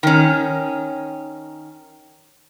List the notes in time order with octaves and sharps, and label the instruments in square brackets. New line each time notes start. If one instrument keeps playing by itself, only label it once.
[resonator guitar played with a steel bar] D#3 C#4